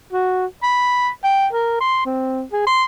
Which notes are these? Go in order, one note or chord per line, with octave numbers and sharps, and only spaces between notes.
F#4
B5
G5
A#4
C6
C4
G#4
C6